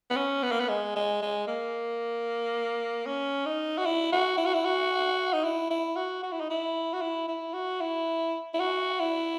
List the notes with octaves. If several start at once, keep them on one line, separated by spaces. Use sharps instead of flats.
B3
C#4
B3
A#3
B3
G#3
G#3
G#3
A#3
C#4
D#4
F#4
E4
F#4
E4
F#4
E4
F#4
D#4
E4
E4
F#4
F#4
E4
D#4
E4
F#4
E4
E4
F#4
E4
E4
F#4
E4